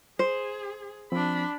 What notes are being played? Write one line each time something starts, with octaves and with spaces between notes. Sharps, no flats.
G#4 C5
F3 C4 D4 B5